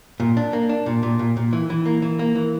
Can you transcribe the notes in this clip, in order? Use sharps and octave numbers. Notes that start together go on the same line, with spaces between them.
A#2
D4
A#3
D4
A#2
A#2
A#2
A#2
E3
E3
A#3
E3
A#3
E3